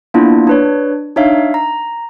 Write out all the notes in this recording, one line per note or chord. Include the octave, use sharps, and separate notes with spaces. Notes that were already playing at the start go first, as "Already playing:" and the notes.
A#3 B3 D4 E4 F4
D4 B4 C#5
D4 D#4 C#5 E5 F5
A#5